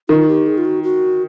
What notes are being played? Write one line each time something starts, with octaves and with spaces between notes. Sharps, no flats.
D#3 F4
G4
G#4
F4
F#4
F#4